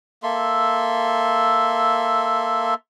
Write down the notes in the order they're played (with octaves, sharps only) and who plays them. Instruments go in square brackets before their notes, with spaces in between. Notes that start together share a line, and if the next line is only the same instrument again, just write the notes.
[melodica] A#3 A4 E5 C6